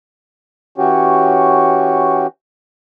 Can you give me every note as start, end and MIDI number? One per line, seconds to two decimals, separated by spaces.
0.78 2.27 52
0.78 2.27 61
0.78 2.27 66
0.78 2.27 67
0.78 2.27 73